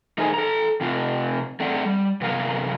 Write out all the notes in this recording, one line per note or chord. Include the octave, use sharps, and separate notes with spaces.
A3 D#4 G#4 A#4 C5 G#5
A4 A#5
C3 C4 F4
A3 C4 D5 F#5
G3
F#2 C3 B3 A#4 F5